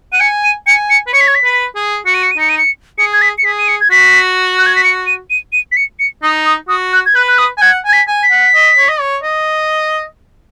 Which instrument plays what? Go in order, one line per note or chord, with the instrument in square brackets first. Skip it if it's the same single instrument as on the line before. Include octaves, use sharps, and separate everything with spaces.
[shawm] F#5 [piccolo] D#7
[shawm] G#5 [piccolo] C#7
[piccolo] D#7
[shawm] G#5 [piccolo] C#7
[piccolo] C#7
[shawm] B4
[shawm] C#5 [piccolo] C#7
[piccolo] B6
G#6
B6
[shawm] B4
G#4
[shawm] F#4 [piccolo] C#7
[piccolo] D#7
C#7
D#7
[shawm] D#4 [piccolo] C#7
[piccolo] D#7
C#7
[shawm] G#4 [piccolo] C#7
[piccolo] G#6
B6
C#7
[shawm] G#4 [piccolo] B6
[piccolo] D#7
C#7
G#6
[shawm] F#4 [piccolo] B6
[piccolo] F#6
G#6
B6
C#7
D#7
D#7
D#7
B6
C#7
C#7
[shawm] D#4 [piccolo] D#6
[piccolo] D#6
[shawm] F#4 [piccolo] D#6
[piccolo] F#6
G#6
[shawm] B4 [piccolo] F#6
[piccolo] F#6
D#6
[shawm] G#5
[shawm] F#5 [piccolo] G#6
[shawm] G#5 [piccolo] G#6
[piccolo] B6
[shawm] G#5
[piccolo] B6
[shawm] F#5
D#5
C#5
D#5
C#5
D#5